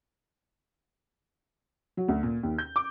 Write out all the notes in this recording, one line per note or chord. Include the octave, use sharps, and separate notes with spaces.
F#3
D2
A#2
D#2
G6
D6